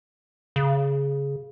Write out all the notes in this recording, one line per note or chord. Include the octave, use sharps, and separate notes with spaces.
C#3